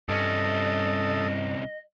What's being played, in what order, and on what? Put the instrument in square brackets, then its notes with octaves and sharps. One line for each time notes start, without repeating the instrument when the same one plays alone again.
[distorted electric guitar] C2 C#4 [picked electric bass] G2 [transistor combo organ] A4 D#6 [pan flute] D#5